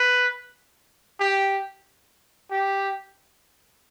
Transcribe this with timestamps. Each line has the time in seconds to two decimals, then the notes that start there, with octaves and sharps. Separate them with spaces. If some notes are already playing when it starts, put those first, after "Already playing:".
Already playing: B4
1.20 G4
2.51 G4